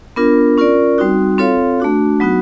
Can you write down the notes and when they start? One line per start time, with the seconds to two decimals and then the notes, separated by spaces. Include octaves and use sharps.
0.16 B3 D4 F4 A#4
0.58 C#4 F4 A#4 D5
0.98 G3 C4 D#4 F#4
1.38 C4 F4 A4 C#5 F5
1.80 A3 D4 F#4
2.20 F#3 B3 D#4 F#4